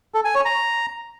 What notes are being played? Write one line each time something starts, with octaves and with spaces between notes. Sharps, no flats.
A4
G#5
C#5
A#5